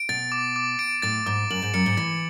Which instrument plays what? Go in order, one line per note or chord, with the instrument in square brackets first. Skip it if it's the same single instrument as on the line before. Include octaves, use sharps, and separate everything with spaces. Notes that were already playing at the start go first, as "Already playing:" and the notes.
Already playing: [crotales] D7
[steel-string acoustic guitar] B2 [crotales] A6
[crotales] D6
D6
D7
[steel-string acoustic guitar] A2 [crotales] A6
[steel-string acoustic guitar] G#2 [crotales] D6
[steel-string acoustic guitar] F#2 [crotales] F#7
[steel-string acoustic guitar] G#2
[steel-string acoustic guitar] F#2 [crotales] C#7
[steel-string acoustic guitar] G#2
[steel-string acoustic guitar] E3 [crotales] A6